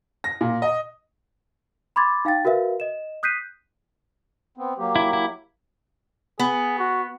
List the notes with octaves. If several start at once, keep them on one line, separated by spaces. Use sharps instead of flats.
A#6
A#2
D#5
B5 C6 D6 G#6 A6
D#4 F5 G5 A6
F#4 A#4 B4 E5 F5
D#5 E7
D#6 F#6 G6 B6 C7 D#7
B3 C4
F#3 A#3 G4
E4
E4
B3 G#4
F#4